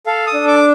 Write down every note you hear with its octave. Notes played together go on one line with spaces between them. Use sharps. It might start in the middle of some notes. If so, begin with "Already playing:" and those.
A4 F5
D#6
D4
D6